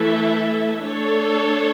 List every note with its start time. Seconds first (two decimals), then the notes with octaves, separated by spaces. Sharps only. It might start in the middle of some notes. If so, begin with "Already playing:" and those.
Already playing: E3 A3 E4 A4 E5
0.78 A3 D4 A4 C#5